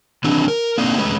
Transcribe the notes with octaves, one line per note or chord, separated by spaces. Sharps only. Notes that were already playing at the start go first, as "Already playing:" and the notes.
D#3 E3 C4 D4
A#4
A#3 C4 D4 D#4 F5
E2 G#3 A3 C#4 B4